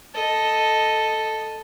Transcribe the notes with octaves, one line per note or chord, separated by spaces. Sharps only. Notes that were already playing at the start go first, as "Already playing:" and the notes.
A4 D#5